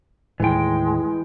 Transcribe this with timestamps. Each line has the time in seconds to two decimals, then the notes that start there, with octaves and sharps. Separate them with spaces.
0.40 D#2 A2 E3 G#3 G5